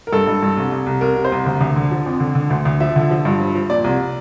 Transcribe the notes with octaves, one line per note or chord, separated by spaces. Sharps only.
A#4
G2 A4
G2
G2
C2
C2
C2
C2 A#4
C3
C5
C2
D2
D2
D3
F3
F2
D3
D3
D2
D2
F3 E5
D3
F3
G2
F3
F3
A#2 D5
C2